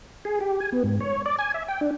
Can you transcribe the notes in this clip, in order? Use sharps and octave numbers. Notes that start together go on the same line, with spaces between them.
G#4
G4
G#5
B3
G#2
C#5
D5
G#5
E5
G5
D4